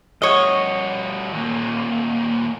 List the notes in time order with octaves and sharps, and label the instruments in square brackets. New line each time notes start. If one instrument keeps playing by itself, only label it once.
[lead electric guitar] G2 F#4 [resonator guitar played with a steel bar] C#5 D#5
[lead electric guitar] D#2 A#2